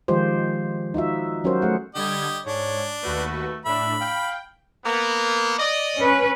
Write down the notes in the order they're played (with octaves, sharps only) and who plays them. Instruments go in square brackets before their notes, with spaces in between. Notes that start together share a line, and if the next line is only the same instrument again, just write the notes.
[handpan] D#3 F3 G#3 F4 G4 C5
D#4 F4 F#4 E5
F#3 C#4 F#4 G4 A#4 C5
A3 G#4 F#5
[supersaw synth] D3 G3 G#6 [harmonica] G4 D#5
[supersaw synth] G#2 [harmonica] D4 [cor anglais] C#5
[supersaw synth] D#2 F#4 B4 [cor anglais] A3
[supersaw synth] A2 D4 [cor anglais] E5 [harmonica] B5
[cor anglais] F5 [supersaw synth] G5
[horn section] A#3 B3
D5 D#5
[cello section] C#4 B4